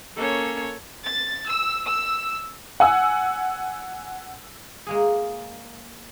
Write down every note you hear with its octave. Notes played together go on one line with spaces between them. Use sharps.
A#3 C#4 A4 C#5
A6
E6
E6
F#5 G#5 E6
G#3 A#3 G#4